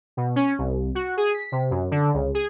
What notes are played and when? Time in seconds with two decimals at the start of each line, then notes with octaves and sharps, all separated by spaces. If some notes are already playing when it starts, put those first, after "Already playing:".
0.17 B2
0.36 C#4
0.58 C2
0.95 F#4
1.17 G#4
1.34 B6
1.52 C3
1.71 F#2
1.91 D3
2.14 C#2
2.34 G#4